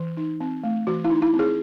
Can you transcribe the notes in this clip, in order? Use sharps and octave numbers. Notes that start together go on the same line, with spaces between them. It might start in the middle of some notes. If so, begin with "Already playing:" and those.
Already playing: E3
D#4
C4
A3
E3 F#4
E4
D#4
E4
C4
G#4